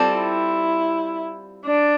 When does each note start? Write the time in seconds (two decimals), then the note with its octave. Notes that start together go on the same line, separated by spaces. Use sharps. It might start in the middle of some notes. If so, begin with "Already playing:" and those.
Already playing: G3 C4 F4 A4
0.15 E4
1.65 D4